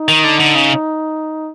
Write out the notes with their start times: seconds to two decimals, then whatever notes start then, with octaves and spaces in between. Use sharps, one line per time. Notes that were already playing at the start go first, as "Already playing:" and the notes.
Already playing: D#4
0.08 D#3
0.24 D3
0.40 D3
0.55 C#3